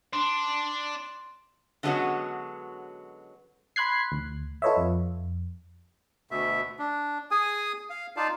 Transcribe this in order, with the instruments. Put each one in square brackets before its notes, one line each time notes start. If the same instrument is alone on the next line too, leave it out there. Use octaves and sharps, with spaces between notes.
[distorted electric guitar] D4 [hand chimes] C6
[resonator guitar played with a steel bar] D3 F#3 G#3 B3 C#4 F#4
[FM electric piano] B5 C6 F#6 G#6 C7
D2
F4 A4 B4 C#5 D#5 E5
F2
[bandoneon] D2 B2 E5
D4
G#4 G#5 D#6
F5
D#4 F4 D5 F5 A5